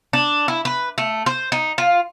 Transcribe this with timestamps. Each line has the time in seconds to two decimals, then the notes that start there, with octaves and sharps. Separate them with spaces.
0.13 D4
0.48 E4
0.65 B4
0.98 A3
1.26 C5
1.52 D#4
1.78 F4